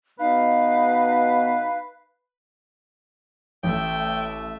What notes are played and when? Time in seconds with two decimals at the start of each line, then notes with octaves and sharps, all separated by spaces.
0.19 B2 D#4 B4 F5
3.63 A1 A3 E5 G5